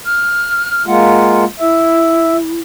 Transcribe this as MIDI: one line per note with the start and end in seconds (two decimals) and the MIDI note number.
0.05 0.85 89
0.86 1.44 56
0.86 1.44 58
0.86 1.44 65
0.86 1.44 78
1.60 2.59 64
1.60 2.37 76